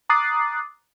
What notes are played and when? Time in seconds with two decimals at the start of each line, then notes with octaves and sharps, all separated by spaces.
0.10 A#5 D6 D#6 F#6 A6 C7